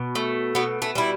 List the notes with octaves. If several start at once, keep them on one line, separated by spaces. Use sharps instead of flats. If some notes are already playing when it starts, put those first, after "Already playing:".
Already playing: B2
A3
B2 B3
A3
G3 E4